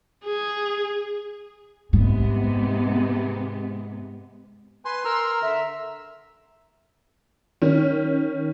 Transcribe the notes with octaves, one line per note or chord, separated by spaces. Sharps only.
G#4
G#2 C3 G#3 B3
B4 G#5 C6
A#4 A#5 E6
D3 E5
D#3 C#4